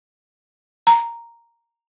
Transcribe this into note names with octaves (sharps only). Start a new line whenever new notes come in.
A#5